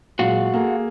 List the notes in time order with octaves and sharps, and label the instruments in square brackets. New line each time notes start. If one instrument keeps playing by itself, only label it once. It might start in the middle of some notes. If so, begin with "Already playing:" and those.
[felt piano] A#2 F#3 G#3 [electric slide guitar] F#4 F5 F#5
[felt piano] A#3 G#4 A4